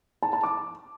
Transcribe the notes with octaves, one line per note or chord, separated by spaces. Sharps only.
A5
A5
D6